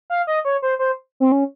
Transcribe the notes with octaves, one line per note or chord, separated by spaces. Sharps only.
F5
D#5
C#5
C5
C5
C4
C#4